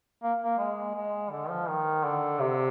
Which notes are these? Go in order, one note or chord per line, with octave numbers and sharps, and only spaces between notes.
A#3
A#3
G#3
G#3
D3
F3
D#3
D3
C3